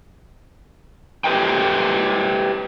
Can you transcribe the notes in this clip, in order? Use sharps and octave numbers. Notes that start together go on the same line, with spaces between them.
G4 B4 D#5 G5